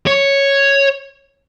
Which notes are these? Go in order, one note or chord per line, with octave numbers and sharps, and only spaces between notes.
C#5